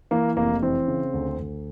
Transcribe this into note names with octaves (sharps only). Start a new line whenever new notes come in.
E3 A#3
F1 A#3
E3 C4
C#3
D2
D2